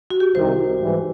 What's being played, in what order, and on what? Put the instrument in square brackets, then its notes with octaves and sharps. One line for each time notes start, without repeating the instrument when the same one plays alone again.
[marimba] F#4
G4
[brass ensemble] C2 C3 D#3 [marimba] C5
[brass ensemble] G#2 E3 G3